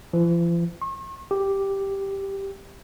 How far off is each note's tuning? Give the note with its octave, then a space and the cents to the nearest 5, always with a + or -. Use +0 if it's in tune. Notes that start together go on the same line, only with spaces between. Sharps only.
F3 -45
C#6 -45
G4 +0